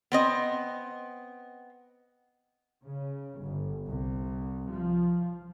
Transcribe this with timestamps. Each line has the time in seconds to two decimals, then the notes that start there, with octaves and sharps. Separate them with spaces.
0.12 B3 C4 D#5
2.83 C#3
3.38 G1
3.87 C2
4.73 F3